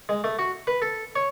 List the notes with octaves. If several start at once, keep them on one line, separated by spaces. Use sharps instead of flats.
G#3
A3
F#4
B4
A4
C#5